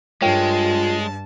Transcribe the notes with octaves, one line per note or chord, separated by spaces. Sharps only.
G2 G#3 F4 A#4 C#5 G5 A5